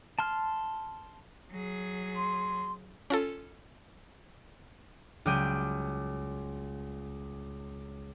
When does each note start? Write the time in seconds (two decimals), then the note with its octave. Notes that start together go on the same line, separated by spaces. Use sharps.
0.19 A5 C6 F6
1.50 F#3 G#4
2.16 C6
3.10 C#4 F4 A4
5.25 C#2 F#3 G3 G5 G6 D#7